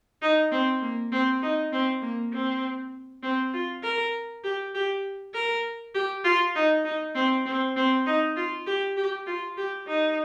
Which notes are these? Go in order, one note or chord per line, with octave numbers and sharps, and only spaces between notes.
D#4
C4
A#3
C4
D#4
C4
A#3
C4
C4
F4
A#4
G4
G4
A#4
G4
F4
D#4
D#4
C4
C4
C4
D#4
F4
G4
G4
F4
G4
D#4